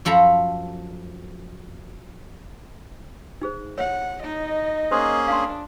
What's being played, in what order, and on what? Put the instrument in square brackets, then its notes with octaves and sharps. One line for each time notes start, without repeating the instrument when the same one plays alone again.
[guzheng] F#2 F3 A4 A#5 B5
[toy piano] D#4 G#4 C5
[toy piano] C#5 [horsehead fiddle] F#5
[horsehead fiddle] D#4 D#5
[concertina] A#3 C#4 G#4 [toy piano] C5 C6 D#6
[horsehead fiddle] D4 [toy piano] F5 C6